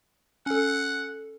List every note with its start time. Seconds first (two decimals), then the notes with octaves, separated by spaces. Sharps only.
0.46 C#4 A4 F#5